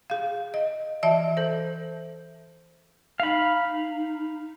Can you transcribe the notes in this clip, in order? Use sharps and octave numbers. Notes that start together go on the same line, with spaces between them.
G#4 F5
D#5
E3 D5 E5 A5
A4 C5
D#4 F5 B5